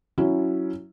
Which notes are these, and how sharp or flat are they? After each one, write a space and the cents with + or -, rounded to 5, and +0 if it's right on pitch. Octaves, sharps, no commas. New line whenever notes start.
F#3 +0 C#4 +0 E4 +0